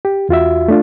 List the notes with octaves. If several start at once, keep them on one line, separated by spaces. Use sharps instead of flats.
G4
E2 F4 F#4 E5
A3 D4 F4